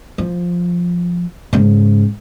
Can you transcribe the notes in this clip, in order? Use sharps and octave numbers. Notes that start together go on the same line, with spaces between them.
F3
G#2 C#3